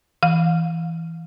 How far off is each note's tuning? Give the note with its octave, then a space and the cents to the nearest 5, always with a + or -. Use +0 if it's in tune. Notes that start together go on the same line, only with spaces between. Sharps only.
E3 +0 F5 +25